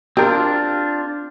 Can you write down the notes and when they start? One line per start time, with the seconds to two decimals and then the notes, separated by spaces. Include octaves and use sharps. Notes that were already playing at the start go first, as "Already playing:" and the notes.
0.17 C4 D4 F4 G4 A#4